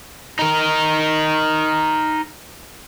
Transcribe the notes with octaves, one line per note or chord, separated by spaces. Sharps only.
D#4 A#4